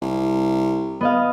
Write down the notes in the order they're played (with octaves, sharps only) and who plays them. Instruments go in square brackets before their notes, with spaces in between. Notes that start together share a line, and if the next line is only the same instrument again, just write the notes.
[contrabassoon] C2
[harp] B3 D#5 F5